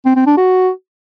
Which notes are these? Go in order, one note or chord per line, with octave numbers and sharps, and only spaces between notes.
C4
C4
D4
F#4